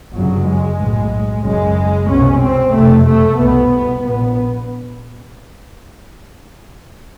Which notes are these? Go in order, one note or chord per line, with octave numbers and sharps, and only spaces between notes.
G1 F#2 C#3 F#3
G#3
B1 A2
F#1 F#2 C#3 G#3
C2 B2 C#4
C4
F#1 F2 C3 A3
A3
C2 B2 B3
A#1 A#2 B3